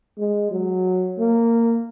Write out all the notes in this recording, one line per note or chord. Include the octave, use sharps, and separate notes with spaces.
G#3
F#3
A#3